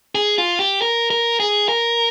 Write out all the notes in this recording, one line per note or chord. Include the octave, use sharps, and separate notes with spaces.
G#4
F4
G4
A#4
A#4
G#4
A#4